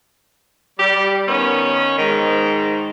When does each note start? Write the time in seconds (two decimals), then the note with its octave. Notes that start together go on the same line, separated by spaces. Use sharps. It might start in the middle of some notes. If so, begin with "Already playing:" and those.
0.79 G3 G4
1.28 D#3 B3 C#4
1.98 G#2 D#3